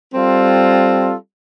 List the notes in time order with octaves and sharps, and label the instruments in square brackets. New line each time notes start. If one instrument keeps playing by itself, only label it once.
[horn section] G3 C4 F4 A4